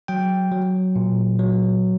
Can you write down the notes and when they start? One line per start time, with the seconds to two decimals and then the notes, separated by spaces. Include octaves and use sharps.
0.08 F#3 G5
0.52 F#3
0.96 A#2
1.39 F#3